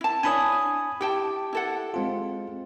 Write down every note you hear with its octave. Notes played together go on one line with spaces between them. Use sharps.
E4 A5
D4 E4 C#5 G#5 B5 D#6
E4 G4 G5 A5
E4 A4 F#5
G#3 C4 F4